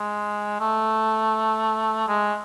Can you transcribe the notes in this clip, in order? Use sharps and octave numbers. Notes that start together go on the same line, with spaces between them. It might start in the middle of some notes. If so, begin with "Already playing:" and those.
Already playing: G#3
A3
G#3